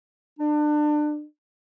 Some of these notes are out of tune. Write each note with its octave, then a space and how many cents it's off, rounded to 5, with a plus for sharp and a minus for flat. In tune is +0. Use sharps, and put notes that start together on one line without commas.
D4 +30